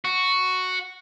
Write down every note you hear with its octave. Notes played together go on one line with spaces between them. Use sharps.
F#4